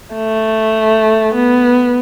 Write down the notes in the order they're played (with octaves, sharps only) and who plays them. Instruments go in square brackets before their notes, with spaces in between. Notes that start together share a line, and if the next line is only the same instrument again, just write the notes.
[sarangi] A3
B3